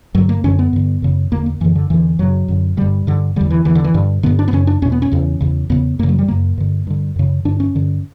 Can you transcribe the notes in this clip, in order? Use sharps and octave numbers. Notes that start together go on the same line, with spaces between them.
G2 D3 F#3
A#3
F#2 D3 C#4
B3
G2 D3
F#2 C#3
E2 D3 A#3
A#3
F#2 D3 E3
D3
E2 D3 E3
F#2 C#3 F#3
F#2 D3
G2 D3 G3
G2 D3
E2 D3 G3
E3
E2 D3 E3
D3
E3
G2 D3
G2 D3 B3
D4
B3
F#2 C#3 C#4
D4
E2 B2 C#4
B3
C#4
E2 C#3
E2 C#3
E2 C#3 B3
F#2 C#3 A#3
F#3
G3
F#2 C#3 A#3
G2 D3
G2 D3
F#2 C#3
G2 D3 D4
C#4
G2 D3